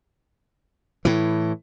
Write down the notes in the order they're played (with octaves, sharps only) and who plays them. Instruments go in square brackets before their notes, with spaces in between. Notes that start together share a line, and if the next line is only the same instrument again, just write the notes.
[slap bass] A2 E3